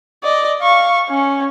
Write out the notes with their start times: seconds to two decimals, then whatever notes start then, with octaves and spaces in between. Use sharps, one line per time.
0.23 D5 D#5
0.62 F5 C#6
1.09 C#4